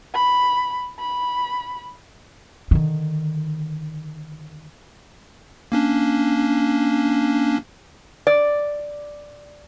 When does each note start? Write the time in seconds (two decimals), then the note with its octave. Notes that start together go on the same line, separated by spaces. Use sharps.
0.14 B5
0.99 B5
2.71 D3 D#3
5.72 A#3 C#4 D4
8.27 D5